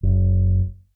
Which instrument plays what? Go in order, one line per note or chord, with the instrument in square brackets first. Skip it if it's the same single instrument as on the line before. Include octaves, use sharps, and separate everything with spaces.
[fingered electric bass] F#1